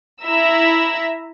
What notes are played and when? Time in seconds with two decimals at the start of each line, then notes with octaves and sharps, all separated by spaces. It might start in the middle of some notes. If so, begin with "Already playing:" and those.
0.22 E4 E5 A#5 E6